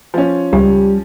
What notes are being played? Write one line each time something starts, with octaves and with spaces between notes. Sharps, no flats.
F3 C#4
C#2 G3 G4